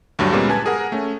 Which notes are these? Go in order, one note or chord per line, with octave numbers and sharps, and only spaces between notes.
D2 G2 F#3 G3
A#2 G3 G#3 A#3 B3 C#4
B4 G#5 A5 G#6
G#4 A#4 F#5
A3 C#4